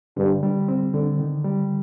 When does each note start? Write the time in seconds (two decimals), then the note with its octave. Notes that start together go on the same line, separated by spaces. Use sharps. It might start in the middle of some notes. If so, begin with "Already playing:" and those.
0.17 G2 D3
0.43 G3
0.68 C4
0.94 D3
1.19 D#3
1.44 G3